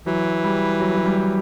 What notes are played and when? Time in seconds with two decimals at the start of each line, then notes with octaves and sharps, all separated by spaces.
0.06 E3 F#3
0.44 G3
0.80 F#3
0.96 F#3
1.05 G3